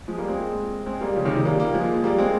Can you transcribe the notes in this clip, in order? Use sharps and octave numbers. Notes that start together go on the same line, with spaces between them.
F3 G#3
G3 A#3
G#3 C4
G#3 C4
G3 A#3
C#3 F3
C3 D#3
C#3 F3
G3 A#3
G3 A#3
F3 G#3
G3 A#3
G#3 C4